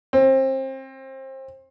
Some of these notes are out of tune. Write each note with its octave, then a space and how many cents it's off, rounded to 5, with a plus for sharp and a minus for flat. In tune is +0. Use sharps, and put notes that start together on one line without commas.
C4 +30